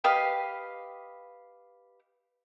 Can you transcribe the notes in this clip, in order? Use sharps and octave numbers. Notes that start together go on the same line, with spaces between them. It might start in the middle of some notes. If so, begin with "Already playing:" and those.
G4 B4 D#5 F5